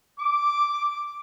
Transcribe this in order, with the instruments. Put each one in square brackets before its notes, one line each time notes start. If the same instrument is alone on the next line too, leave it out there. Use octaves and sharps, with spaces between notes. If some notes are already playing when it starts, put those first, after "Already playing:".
[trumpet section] D6